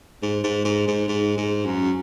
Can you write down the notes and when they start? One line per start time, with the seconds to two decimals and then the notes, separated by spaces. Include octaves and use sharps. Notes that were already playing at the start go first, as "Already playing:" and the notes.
0.23 G#2
0.44 G#2
0.65 G#2
0.88 G#2
1.08 G#2
1.38 G#2
1.66 F#2